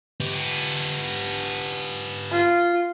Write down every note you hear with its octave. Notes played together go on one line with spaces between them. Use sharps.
B3 G4
F4